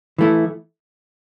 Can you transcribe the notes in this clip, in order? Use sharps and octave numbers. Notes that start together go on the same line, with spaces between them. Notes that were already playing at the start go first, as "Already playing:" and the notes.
E3 A3 E4